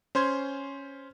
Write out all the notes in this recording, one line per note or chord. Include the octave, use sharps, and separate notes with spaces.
C#4 C5 C6 G#6